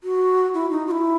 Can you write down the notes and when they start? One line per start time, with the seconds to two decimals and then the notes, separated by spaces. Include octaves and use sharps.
0.03 F#4
0.54 E4
0.70 D#4
0.87 F#4
0.91 E4